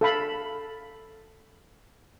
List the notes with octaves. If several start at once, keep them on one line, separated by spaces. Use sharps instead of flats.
A4 F5 B5